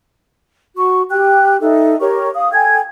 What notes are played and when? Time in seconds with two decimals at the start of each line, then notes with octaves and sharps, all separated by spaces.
0.76 F#4 C#6
1.10 G4 G5 F#6
1.61 D#4 A4 E5
2.00 G4 A#4 C#5 C#6
2.34 F5 D#6
2.52 A4 G5 G#5 G#6